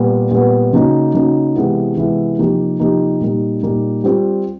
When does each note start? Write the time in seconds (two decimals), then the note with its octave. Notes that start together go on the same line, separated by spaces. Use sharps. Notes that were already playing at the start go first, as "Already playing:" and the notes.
Already playing: A#2 G3 B3
0.31 A#2 G3 B3
0.72 C#3 F#3 A#3 D#4
1.15 C#3 F#3 A#3 D#4
1.55 C3 E3 G#3 B3 E4
1.97 C3 E3 G#3 B3 E4
2.38 C3 F3 A#3 D#4 G4
2.80 C3 F3 A#3 D#4 G4
3.21 A#2 G3 A#3 D#4
3.63 A#2 G3 A#3 D#4
4.04 G3 C4 F4